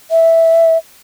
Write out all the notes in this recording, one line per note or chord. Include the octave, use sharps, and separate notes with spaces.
E5